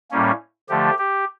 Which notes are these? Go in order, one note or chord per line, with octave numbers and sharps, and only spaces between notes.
A2 G3 A#3 C#4
D3 F3 A3 G4
G4